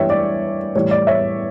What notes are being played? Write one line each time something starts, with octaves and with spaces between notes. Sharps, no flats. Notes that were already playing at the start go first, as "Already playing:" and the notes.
Already playing: G2 E3 G3 C#5 E5 G5
D5
A2 E3 G3 C#5
D5
C#5 E5